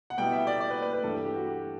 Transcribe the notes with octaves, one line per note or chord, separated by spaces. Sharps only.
F#5
B2 G3 B3 E4 G5
E5
D5
D5
B4
B4
B4
G2 E3 G3 A4
G4
G4
F#4
G4